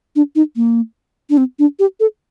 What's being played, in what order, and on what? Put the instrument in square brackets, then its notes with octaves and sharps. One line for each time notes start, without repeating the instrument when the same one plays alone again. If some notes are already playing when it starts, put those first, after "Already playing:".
[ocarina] D4
D#4
A#3
D4
C4
D4
G4
A4